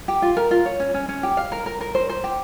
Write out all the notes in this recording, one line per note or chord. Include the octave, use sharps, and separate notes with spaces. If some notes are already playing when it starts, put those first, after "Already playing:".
G4
F4
A#4
F4
C#5
C#4
C#4
C#4
G4
F5
A#4
A#4
A#4
C5
C5
G4